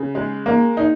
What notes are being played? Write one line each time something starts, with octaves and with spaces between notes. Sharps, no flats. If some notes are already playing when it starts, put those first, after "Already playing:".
Already playing: C#3
G#3
A#3
D#4